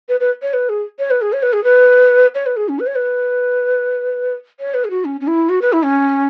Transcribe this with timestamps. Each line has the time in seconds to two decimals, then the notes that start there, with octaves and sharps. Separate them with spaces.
0.09 B4
0.20 B4
0.42 C#5
0.53 B4
0.69 G#4
0.99 C#5
1.11 B4
1.22 G#4
1.33 C#5
1.43 B4
1.53 G#4
1.64 B4
2.35 C#5
2.46 B4
2.57 G#4
2.69 C#4
2.79 B4
2.87 C#5
2.96 B4
4.60 C#5
4.74 B4
4.85 G#4
4.90 F#4
5.05 C#4
5.21 C#4
5.27 E4
5.49 F#4
5.62 B4
5.73 E4
5.83 C#4